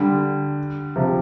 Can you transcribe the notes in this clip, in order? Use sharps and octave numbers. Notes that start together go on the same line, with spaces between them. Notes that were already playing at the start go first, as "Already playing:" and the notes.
Already playing: D3 G3
C3 F3